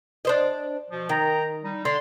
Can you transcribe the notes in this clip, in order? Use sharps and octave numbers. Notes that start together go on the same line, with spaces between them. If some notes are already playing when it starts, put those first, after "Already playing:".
D4 C5 D#5
B2 F3
D#3 G5 A#5
G3 D#4
D3 C6